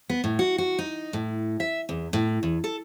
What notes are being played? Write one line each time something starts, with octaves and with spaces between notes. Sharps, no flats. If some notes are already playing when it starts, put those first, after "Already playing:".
B3
A2
F#4
F#4
D#4
A2
E5
E2
A2
E2
A4